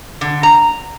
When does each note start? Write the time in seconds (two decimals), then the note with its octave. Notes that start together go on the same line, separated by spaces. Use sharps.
0.21 D3
0.43 A#5